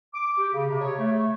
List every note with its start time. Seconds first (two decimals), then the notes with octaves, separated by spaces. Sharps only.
0.14 D6
0.38 G4
0.54 C#3
0.70 C3
0.81 C#5
0.99 A3